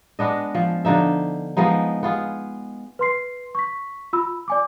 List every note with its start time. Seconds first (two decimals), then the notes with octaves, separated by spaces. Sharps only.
0.19 G#3 B3 D4 D#5
0.55 F3
0.85 D3 F3 D#4 E5
1.57 F3 G#3 B3 D#4
2.03 B3 F4 G#4
2.99 B4 C6 C7
3.55 C#6 B6
4.13 F4 B5 E6
4.48 D5 G#5 D6